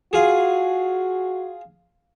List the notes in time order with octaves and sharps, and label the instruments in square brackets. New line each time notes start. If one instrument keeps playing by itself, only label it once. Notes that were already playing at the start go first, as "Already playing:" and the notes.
[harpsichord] F4 G#4 [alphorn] F#4